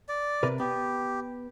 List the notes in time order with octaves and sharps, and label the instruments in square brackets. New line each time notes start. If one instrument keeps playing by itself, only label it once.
[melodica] D5
[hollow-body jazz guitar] C3 A#4 B4
[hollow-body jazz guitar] B3 [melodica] G4